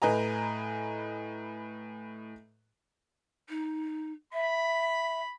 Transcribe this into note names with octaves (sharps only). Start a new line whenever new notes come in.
A2 B4 D#5 G#5 A#5
D#4
E5 B5